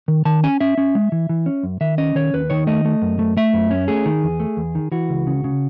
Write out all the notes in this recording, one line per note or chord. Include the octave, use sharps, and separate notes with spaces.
D#3
D#3 A5
C#4 G#5
C#4 E5
C#4
G#3
E3
E3
C#4
F#2
D#3 E5
C#4 D#5
D#3 C#5
D#2 B4
D#3 C#5
A3 D#5
A3
F#2
A3
A3 E5
F#2
C#4
A3 G#4
D#3
E2
A3
E2
D#3
E3 F#4
C#2
C#3
C#3